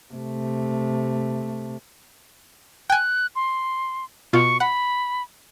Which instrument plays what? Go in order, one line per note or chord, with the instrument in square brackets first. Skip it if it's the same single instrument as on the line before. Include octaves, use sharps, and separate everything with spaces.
[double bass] C3 A3
[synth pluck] G5 G#5 [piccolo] F#6
[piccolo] C6
[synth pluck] B2 F4 [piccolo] C#6
[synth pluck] F#5 [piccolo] B5